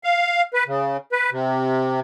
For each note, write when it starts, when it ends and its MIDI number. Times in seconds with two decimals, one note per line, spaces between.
0.04 0.42 77
0.54 0.64 71
0.67 0.97 49
1.12 1.30 71
1.32 2.00 48